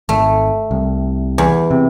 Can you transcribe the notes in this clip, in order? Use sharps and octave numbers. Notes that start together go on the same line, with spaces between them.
G#1 A3
C2
E2
C3